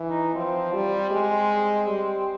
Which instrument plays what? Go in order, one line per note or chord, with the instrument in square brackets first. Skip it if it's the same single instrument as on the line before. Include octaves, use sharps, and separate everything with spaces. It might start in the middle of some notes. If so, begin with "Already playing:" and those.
Already playing: [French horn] E3
[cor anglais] D#4
[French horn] F3 [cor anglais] C4
[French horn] G3
G#3
G3